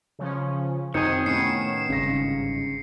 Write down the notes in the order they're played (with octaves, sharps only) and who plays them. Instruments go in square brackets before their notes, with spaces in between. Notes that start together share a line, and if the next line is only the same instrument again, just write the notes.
[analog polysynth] C#3 F3 C#4
[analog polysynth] F#2 C3 [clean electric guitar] D#3 G#4 [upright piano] C4 D#4 G6 [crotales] C#7
[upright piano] A2 [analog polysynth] B3 C#4 E7 [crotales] C7 C#7
[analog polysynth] G1 G#2 [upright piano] C#3 A#6